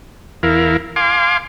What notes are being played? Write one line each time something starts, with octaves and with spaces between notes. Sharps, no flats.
E2 E4 A#4 F5
F5 G#5 C6 D6